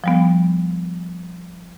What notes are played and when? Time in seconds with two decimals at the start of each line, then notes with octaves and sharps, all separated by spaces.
0.04 F3 G3 B3